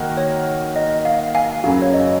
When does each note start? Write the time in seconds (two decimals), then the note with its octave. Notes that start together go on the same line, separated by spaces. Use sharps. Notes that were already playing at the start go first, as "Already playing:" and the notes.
Already playing: D#3 A#3 F#4 A#4
0.17 C#5
0.76 D#5
1.05 F5
1.35 F5 G#5
1.64 F#2 C#3 F#3 F5
1.82 C#5
1.93 D#5